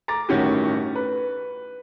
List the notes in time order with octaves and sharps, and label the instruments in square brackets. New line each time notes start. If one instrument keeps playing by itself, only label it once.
[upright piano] A#5 D6 A6
G1 A2 D#3 C#4 F#4 G4
B4